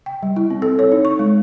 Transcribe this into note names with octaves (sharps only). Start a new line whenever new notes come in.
G5
G3
E4
C4
A4
C#5
D#4
C#6
G#3